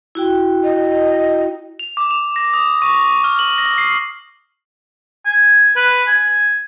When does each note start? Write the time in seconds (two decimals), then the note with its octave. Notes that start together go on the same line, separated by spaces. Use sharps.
0.15 E4 F#4 G5
0.64 D#5
1.79 F7
1.97 D6
2.11 F7
2.36 A#6
2.54 D#6
2.82 C#6
3.24 F6
3.39 F#7
3.58 A#6
3.78 C7
5.26 G#5
5.76 B4
6.07 G#5